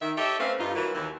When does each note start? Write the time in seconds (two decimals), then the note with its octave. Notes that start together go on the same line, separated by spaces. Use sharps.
0.02 D#3 E5
0.17 G4 A4 C#5 D#5 E5
0.40 A3 C4 C#4 B4 E5 F5
0.60 G2 D#4 F4
0.76 E3 F#3 A#3
0.95 D#2 E3